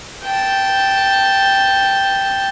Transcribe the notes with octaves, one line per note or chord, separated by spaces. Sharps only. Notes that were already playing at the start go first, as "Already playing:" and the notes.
G5 A5